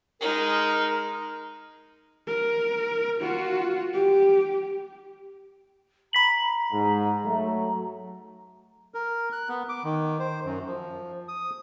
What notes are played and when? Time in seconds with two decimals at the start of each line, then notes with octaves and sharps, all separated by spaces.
0.21 G#3 D#4 A#4
2.27 A#4
3.21 F4 F#4
3.93 G4
6.13 A#5 B5 B6 F#7
6.72 G#2
7.24 F#3 A3
8.94 A#4
9.32 F#6
9.49 B3
9.69 D6
9.84 D#3
10.20 C5
10.45 F#2
10.67 F3
11.28 D#6